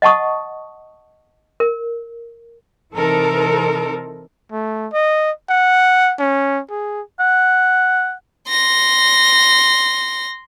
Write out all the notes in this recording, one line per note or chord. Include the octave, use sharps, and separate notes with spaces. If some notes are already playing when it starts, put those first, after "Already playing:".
D#5 F#5 A5 C#6 D#6
A#4
C3 E3 D#4 A4 A#4 C5
A3
D#5
F#5
C#4
G#4
F#5
C6 A#6